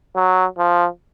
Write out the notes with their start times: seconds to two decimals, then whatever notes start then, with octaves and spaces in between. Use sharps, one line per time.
0.16 F#3
0.58 F3